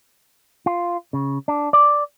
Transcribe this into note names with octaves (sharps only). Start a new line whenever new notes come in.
F4
C#3
D4
D5